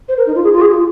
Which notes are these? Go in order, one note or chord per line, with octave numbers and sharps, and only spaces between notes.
C5
A#4
D#4
F4
G#4
F4
G#4
F4